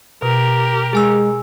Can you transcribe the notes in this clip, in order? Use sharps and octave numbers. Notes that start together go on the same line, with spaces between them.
B2 G4 A#4
G#3 G#4 G#5 E6